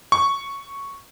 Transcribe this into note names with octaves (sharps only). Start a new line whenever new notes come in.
C#6